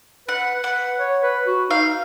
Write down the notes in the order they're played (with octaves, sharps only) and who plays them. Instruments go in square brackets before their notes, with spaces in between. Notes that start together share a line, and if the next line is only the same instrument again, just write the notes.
[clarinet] B4 [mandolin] F#5
[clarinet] B4 [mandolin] F#5
[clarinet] C#5
B4
F#4
[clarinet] D#4 [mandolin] F5